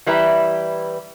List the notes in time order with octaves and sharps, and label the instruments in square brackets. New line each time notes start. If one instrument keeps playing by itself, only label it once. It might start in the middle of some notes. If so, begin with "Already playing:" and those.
[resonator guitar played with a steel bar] E3 G3 E4 B4 A#5